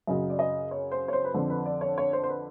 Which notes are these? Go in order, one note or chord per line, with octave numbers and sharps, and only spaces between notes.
F#2 C#3 F#3 D#5
D5
D#5
C#5
C5
C#5
C5
B4
F2 D3 F3 C5
B4
D5
C#5
C#5
C5
C5
B4